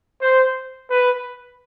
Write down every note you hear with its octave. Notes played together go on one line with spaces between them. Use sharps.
C5
B4